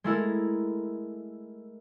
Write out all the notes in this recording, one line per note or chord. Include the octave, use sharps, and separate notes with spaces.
G#3 A3 E4 A#4